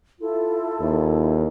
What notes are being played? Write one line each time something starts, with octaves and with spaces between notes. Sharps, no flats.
E4 F4 A4
D#2